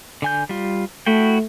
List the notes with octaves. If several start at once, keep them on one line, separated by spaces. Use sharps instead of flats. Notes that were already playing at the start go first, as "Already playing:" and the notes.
D3 G#5 G6
G3 F4
A3 E4 F#4 G5